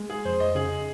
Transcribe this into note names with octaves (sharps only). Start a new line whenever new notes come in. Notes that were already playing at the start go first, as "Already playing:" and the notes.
Already playing: G#3
G#4
F2 C5
D#5
C#3 G#4